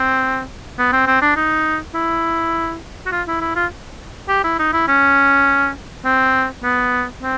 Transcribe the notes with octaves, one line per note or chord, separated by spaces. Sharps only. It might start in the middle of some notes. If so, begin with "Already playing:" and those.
Already playing: C4
B3
C4
C4
D4
D#4
E4
F#4
F4
E4
E4
F4
G4
E4
D#4
E4
C#4
C4
B3
C4